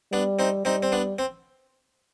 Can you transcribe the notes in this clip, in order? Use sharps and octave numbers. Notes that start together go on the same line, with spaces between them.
G3 B3 D4
C4 D#4
G3 C4 D#4
C4
B3 D4
C4